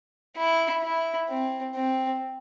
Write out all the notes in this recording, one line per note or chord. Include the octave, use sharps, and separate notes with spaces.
E4
E4
C4
C4